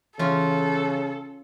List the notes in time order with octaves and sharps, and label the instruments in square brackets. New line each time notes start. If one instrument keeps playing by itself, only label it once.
[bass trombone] C#3 [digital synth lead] E3 [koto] C#4 F4 [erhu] A4